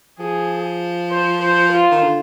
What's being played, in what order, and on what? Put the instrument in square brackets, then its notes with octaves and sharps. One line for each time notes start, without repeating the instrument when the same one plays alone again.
[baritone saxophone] F3 [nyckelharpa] G#4
[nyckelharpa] C5
C5
F4
[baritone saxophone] D#3
D3